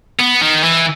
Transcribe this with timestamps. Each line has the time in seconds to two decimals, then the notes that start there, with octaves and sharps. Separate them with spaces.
0.19 B3
0.42 D#3
0.64 E3